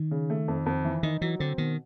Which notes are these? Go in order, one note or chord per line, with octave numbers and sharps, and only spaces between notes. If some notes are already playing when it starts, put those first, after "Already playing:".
Already playing: D#3
C#3
A3
F2
F2
E3
D#3 D#4
E3 F#3
D3 C4
B2 D#3